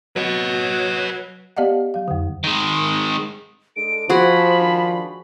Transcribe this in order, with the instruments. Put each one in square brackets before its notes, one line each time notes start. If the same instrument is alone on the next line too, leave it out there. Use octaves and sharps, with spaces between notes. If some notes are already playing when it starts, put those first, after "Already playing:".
[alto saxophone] F#3 [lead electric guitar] B4 D#5
[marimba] B3 G4 D5 D#5 F5 F#5
F#3 F5
F2 D3
[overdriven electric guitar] D#3 G#3
[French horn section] G#3 D4 A4 [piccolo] D7
[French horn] F3 [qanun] F#4 G#4 [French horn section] C5 [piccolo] B5
[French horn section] G#2 D#3 D4